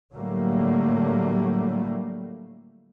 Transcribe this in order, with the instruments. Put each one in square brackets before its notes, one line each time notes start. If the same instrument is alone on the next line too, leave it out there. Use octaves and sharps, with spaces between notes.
[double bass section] A2 D3 F#3 G3 A3 A#3